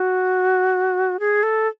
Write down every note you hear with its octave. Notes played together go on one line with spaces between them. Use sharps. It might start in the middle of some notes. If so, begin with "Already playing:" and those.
Already playing: F#4
G#4
A4